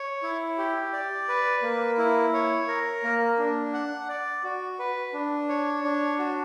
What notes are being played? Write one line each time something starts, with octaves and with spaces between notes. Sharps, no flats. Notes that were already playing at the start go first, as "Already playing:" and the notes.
Already playing: C#5
E4
G4
D5
B4
A#3
E4
C#5
A#4
A#3
D4
F#5
D5
F#4
B4
D4
C#5
D4
F#4